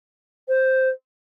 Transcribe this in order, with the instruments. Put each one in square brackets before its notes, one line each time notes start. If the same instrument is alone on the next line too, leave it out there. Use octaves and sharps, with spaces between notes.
[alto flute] C5